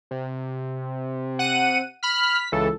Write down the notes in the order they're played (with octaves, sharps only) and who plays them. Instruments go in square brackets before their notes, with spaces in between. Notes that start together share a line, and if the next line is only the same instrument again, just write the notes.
[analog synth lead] C3
[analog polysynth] F#5 D#7
[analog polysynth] B5 F6 [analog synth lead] B6
[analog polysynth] C#2 A4 [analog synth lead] E3